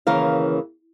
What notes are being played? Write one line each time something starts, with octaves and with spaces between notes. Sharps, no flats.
D#2 C#3 E3 A#4 F5